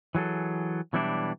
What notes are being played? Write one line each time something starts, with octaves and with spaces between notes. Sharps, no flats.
E3 F#3 G#4 A4
B2 E3 F#3 G3 D4 E4